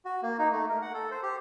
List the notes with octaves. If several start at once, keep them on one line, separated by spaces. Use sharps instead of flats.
F#4
A#3
D#4
A3
A#4
F#5
A4
C5
G4